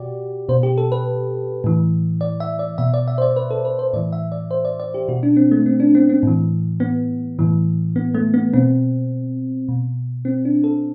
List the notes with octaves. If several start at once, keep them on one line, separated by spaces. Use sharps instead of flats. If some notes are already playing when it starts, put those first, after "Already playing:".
Already playing: B2 F#4 G4 D5
B2 C5
G4
A4
B4
A2 E3
D5
E5
D5
B2 E5
D5
E5
C5
D5
B4
A4
B4
C5
A2 E3 D5
E5
D5
C5
D5
D5
G4
B2 F#4
D4
C4
A3
C4
D4
C4
C4
A2 E3
B3
A2 E3
B3
A3
B3
B2 C4
B2
C4
D4
A4